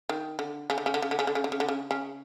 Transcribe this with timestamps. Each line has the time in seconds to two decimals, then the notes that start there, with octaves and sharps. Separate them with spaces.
0.09 D#3
0.39 D3
0.70 C#3
0.78 D3
0.86 C#3
0.94 D3
1.02 C#3
1.11 D3
1.19 C#3
1.27 D3
1.35 C#3
1.44 D3
1.52 C#3
1.60 D3
1.69 C#3
1.91 C#3